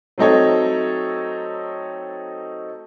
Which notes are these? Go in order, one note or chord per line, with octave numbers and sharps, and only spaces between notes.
F#3 A3 C4 D#4 A4 C#5